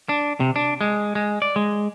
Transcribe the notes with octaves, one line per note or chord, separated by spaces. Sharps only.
D4
C3
D4
G#3
G#3
D5
G#3